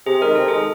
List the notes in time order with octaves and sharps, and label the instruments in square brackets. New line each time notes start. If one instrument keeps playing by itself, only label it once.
[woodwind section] C3 [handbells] G#4
[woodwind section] D#3 G#3 [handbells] A#4
[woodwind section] C3 [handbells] A4
[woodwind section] D#3 G#3 [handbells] G#4